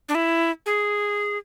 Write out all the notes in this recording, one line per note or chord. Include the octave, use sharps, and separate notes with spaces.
D4
E4
G#4